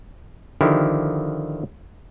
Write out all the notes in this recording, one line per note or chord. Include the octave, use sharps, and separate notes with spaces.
D3 D#3 F3 E4 G4